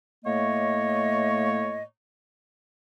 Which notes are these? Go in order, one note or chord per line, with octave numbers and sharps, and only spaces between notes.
A2 A3 A#3 C#5 D#5